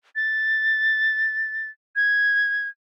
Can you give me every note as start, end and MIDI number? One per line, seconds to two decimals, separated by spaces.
0.16 1.69 93
1.96 2.68 92